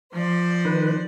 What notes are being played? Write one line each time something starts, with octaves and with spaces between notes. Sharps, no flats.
F3 C5 D5
D#3 B4